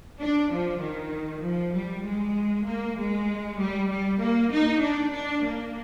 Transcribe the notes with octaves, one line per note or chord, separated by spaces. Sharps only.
D4
F3
D#3
F3
G3
G#3
A#3
G#3
G3
G3
A#3
D#4
D4
D4
A#3